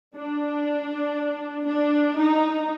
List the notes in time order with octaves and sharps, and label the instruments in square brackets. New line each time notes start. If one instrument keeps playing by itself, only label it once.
[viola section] D4
D4
D#4